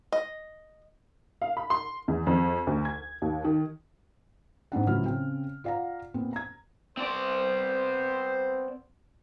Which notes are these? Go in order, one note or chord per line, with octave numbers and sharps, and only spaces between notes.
D#5
F5
B5
C6
E2
F2
D2
G#6
D#2
D#3
G#2 C4 D4 F#5
C#2 A2 F#3 E4 F6
C#3 C4 G5
F4 D5 F5 F#5 A#5
A#2 B3 C4
A#5 G#6
B3 C4 C5 D5